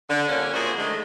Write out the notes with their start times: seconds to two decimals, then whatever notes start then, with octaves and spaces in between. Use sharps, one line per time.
0.09 D3
0.28 F2 C#3 G3 A#3 C#4
0.54 F3 A#3 E4 F#4 G#4 C5
0.79 D3 D#3 G#3 A3